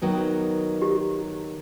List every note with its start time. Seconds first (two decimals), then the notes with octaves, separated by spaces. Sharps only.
0.02 D#3 F#3 B3
0.82 G4